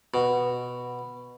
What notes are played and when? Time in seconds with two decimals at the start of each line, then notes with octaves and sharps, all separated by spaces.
0.14 B2